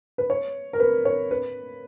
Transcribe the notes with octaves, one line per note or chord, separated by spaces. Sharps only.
B4
C#5
A#4
B4
C#5
B4